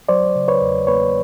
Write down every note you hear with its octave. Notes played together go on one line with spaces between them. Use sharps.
F#3 C5 D5
C#3
B4 C#5
E2
A#3 B4 C#5